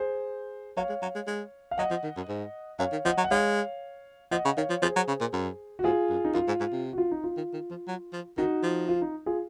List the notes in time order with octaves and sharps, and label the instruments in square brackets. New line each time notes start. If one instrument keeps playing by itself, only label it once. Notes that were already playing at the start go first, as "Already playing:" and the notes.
Already playing: [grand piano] G#4 C5
[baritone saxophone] F#3 [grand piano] C#5 F5
[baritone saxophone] G#3
F#3
G#3
G#3
[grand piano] F5
[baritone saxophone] F#3 [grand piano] D#5 F#5
[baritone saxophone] F3
D#3
F#2
G#2
[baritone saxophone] F#2 [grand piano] C#5 F5
[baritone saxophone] D#3
[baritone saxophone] F3 [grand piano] D#5 F#5
[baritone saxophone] F#3
[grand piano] F#5
[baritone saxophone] G#3 [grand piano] C#5 F5
[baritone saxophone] F3 [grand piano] D#5 F#5
[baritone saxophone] C#3
[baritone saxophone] D#3 [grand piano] C#5 F5
[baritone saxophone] F3
[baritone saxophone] F3 [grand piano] G#4 C5
[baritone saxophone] F#3
C#3
A#2
F#2
[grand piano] F#4
[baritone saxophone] G#2 [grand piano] F4 G#4
[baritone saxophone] F#2
[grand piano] D#4
[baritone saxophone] F#2 [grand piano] F4
[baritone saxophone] G#2
G#2
C3
[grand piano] F#4
F4
D#4
F4
[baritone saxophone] D#3
D#3
F3
F#3
F3
[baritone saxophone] D#3 [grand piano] D#4 F#4
[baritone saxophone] F3
[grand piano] F4
D#4
F4 G#4